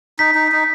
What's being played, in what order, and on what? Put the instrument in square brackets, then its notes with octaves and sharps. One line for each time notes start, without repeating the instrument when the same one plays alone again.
[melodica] D#4 [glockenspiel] B6
[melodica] D#4
D#4